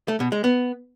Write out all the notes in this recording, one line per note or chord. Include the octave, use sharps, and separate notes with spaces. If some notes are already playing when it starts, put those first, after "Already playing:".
A3
B2
G#3
B3